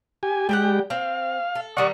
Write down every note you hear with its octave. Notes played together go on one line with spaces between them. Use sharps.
G4 G#5
G3 G#3 G4 F#5 G5
C4 F5
A4
D#3 G3 D#4 D5 F#5 C#6